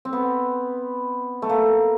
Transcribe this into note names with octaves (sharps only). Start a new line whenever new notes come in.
C4
B3
A3
A#3